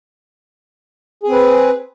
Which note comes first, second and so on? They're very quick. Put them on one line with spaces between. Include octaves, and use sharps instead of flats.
G#4 C4 B4